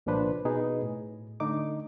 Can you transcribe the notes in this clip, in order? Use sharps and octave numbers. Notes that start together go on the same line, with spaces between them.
C2 A#2 F3 D4 B4 C5
B2 D#4 G#4 B4
A2
D3 A3 D#4 D6